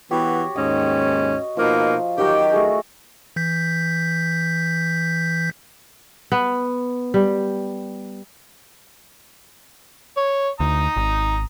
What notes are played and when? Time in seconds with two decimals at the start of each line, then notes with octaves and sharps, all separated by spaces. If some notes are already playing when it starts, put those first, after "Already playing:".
0.11 E3 B3 F#4 G4 C#5
0.56 D#2 G#2 C#4 D#5 F#5
1.57 B2 F3 A#3 D#4 F5
2.18 D#3 F#3 G4 A#4
2.52 A3 F#4 G#4
3.36 E3 G6 B6
6.32 B3
7.14 G3
10.17 C#5
10.60 D2 A#5 D#6
10.96 G#1